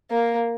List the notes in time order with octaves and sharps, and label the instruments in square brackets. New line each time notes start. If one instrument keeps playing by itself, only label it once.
[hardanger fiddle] A#3